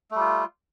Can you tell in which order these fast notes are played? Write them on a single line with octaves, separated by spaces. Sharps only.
A3 G3 F4